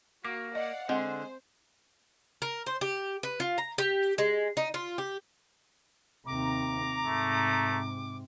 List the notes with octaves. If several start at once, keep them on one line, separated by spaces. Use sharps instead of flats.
A#3 F#4 D6
D5 D#5 F5 F#5
D3 G#3 C4 C5 F#5
A#4
C5
G4
B4
F4
A#5
G4
G#3
D#4
F4
G4
D#2 C3 A#5 D6
G#2 C3 A3